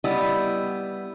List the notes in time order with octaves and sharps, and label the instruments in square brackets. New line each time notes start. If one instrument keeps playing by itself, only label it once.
[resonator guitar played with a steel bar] G3 B3 E4 D#5